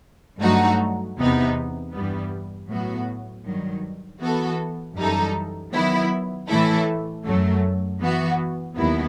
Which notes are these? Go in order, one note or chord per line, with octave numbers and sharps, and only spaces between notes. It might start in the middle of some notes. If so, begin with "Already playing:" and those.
G2 F#3 A3 D#4 F#4
E2 C3 E3 B3 D#4
G2 E3 G3 B3
A2 F#3 B3 F#4
G2 D#3 F#3
E3 B3 F#4 A4
F#2 E3 G3 D#4 A4
D#3 F#3 B3 E4
A2 E3 A3 E4 A4
F#2 F#3 A3
E3 B3 F#4
D#2 D#3 F#3 B3 E4